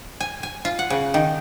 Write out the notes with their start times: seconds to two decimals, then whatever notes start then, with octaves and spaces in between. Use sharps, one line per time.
0.20 G#5
0.43 G#5
0.65 F4
0.79 F#5
0.90 C#3
1.14 D#3